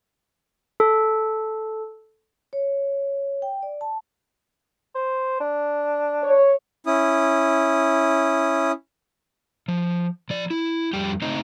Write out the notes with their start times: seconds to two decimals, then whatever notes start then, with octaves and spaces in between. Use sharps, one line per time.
0.80 A4
2.53 C#5
3.42 G5
3.63 D5
3.81 A5
4.95 C5
5.40 D4
6.23 C#5
6.86 C#4 E4 D#6
9.68 F3
10.30 F3 D5
10.50 E4
10.93 F2 G3 G4 G5
11.22 C#3 A3 C4 D#4 C5 D#5